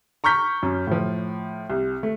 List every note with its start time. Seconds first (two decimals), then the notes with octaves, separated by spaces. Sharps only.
0.24 A#5 C#6 F6 G6 B6
0.63 F#2
0.87 A2 F3
1.70 C2
2.03 A3